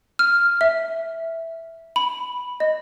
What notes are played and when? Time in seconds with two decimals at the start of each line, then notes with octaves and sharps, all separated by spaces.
0.19 F6
0.61 E5
1.96 B5
2.60 D#5